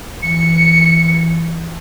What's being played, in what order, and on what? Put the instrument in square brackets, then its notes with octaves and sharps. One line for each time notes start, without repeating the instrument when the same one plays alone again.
[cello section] E3 [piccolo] C#7